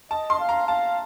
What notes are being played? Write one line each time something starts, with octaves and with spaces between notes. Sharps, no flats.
D#5 A5
C6
F5
A#5
F5 A5